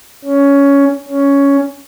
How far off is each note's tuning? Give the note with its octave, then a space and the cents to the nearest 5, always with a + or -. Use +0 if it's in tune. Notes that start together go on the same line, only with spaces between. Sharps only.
C#4 +15
C#4 +10